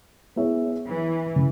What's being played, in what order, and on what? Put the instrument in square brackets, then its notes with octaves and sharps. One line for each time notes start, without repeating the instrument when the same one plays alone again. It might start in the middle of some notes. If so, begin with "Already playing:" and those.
[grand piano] B3 E4 G#4 C#5 E5
[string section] E3
[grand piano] C#3